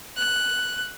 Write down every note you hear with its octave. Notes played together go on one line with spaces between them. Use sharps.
F#6